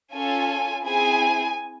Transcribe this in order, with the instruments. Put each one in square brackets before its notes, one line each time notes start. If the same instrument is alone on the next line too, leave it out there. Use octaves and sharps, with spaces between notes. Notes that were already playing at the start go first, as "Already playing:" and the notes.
[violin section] C#4 F4 A4 G#5
C4 E4 G#4 G#5